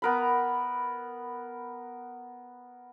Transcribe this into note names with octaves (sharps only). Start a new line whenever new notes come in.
B3 A#4 B5